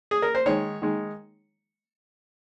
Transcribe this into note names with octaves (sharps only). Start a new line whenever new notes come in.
G#4
A#4
C5
D#3 G#3 C#5
D#3 G#3